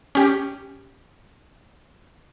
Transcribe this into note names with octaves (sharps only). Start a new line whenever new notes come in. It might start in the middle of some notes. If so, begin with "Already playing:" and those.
C#4 G4